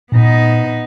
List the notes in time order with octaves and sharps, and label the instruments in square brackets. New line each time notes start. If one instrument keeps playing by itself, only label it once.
[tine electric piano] A#2 [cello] B3 D#4